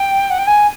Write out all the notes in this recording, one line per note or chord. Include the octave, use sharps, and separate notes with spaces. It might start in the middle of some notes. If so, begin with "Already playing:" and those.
Already playing: G5
F#5
G5
G#5